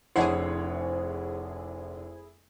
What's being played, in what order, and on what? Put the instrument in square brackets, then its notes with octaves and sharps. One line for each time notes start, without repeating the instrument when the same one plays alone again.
[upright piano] F1 D4 C7 [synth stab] E4 G#4 [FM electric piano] C5 [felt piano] C#5 F#5